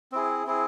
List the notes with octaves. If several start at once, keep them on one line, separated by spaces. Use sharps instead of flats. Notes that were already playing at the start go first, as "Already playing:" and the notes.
C4 E4 G#4
C4 E4 G#4